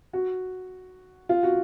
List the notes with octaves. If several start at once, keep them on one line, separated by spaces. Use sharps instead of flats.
F#4
F4
F#4